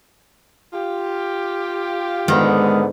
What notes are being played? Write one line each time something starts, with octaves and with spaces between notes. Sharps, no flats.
F4 G4
G#2 D3 D#3 G#3 B3